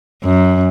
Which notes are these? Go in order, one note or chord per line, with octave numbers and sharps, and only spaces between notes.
F#2